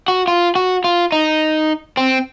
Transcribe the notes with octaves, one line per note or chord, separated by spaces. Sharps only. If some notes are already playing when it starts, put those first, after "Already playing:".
F#4
F4
F#4
F4
D#4
C4